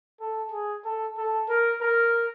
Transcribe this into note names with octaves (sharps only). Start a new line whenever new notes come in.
A4
G#4
A4
A4
A#4
A#4